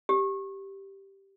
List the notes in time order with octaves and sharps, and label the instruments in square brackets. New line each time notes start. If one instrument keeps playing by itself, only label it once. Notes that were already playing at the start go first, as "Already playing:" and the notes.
[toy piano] G4